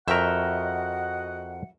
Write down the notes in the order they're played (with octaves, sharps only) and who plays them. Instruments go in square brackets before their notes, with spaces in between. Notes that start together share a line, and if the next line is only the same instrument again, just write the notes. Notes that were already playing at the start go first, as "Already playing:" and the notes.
[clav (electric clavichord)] F2 A#4 [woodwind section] F#4 D#5 F#5 [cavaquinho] E5 G5 C#6